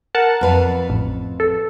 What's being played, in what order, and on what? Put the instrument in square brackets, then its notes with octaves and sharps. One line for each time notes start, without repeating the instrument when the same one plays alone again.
[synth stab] A#4 F#5 A5
[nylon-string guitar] F2 B4 F5
[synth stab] A1
A4